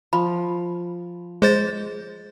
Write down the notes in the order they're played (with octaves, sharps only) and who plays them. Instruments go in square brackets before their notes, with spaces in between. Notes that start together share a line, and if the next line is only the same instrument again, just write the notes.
[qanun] F3 [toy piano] B5
[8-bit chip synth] G#3 C5 A6 [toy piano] G#4